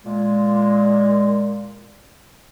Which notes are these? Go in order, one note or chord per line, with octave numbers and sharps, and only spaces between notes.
A#2 G#3